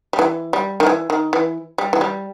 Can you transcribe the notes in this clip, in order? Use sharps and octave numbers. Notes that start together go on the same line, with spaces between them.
G3
E3
G3
D#3
E3
D#3
E3
G3
E3
G3